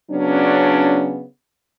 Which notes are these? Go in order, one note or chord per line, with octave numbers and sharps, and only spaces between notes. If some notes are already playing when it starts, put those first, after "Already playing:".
C#3 F#3 B3 C#4 D4